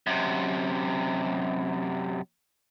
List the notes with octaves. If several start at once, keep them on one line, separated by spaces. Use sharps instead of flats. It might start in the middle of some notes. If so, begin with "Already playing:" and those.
F#2 C3